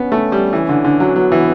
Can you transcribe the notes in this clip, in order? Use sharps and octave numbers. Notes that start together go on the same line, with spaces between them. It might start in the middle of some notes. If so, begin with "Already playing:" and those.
Already playing: B3 C#4
A3
G3
E3
D3
D3
F#3
F#3 B3
E3